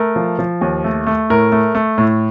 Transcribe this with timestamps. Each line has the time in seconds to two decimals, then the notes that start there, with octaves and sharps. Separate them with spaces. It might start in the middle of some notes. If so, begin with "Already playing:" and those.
Already playing: A3 A#4
0.16 F3
0.39 F3
0.61 D#2
0.84 A3
1.06 A3
1.30 A2 A#4
1.52 A3
1.75 A3
1.98 A2